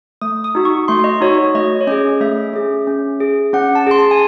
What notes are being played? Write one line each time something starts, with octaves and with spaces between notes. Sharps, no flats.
A3 D#6
D#6
D#4 F#4
C#6
A3 C6
D#5
D#4 F#4 C#5
C#5
A3 D#5
C#5
C#4 G#4 D#5
A3 E5
C#4 G#4
C#4
G#4
C#4 F#5
A5
G#4 C6
A5
G#5